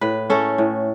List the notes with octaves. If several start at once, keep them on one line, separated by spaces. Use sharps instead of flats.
A2 B4
A3 C#4 A4
A2